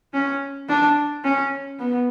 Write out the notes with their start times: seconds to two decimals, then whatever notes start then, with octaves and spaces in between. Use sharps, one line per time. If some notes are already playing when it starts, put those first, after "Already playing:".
0.14 C#4
0.69 D4
1.24 C#4
1.79 B3